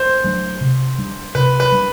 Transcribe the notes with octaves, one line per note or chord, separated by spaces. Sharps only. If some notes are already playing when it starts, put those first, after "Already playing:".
Already playing: C5
F#3 A3 D4
C3
G3 D4
C3 B4
B4
G3 D4